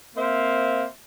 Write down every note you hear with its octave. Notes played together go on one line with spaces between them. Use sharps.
A#3 C4 C5 E5 F5